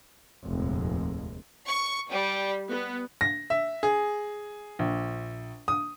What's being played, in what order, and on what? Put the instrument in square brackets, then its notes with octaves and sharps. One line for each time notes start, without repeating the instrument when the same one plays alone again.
[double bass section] F1 A#1 D#2 G#3
[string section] C#6
G3
B3
[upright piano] A#6
E5
G#4
A#1
D#6